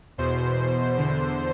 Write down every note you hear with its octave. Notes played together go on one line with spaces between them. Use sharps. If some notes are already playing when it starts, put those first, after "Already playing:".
E2 B2 C5
E2 D3